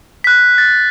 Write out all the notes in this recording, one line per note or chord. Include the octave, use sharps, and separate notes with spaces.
F#6 B6
A6